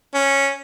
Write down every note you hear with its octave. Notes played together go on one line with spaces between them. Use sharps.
C#4